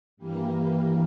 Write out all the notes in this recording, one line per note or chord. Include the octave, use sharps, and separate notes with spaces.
G2 E3 G3 A#3